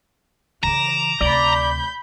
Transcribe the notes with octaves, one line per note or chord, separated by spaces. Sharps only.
C#3 E3 A#5 D6 E7
D2 C3 D5 B5 G6